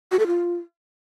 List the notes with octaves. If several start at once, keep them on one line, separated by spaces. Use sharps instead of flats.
F#4
A4
F4